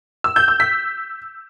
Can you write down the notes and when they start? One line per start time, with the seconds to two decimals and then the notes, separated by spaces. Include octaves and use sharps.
0.24 E6
0.36 G6
0.48 E6
0.60 B6